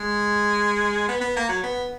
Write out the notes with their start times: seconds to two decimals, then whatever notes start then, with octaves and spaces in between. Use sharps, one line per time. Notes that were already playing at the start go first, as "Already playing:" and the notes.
Already playing: G#3
1.08 B3
1.21 B3
1.36 A#3
1.49 F#3
1.63 B3